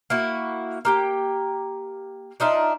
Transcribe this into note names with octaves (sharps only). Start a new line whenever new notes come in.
A#3 E4 F#4
A#3 G4 G5
D4 D#4 F4 E5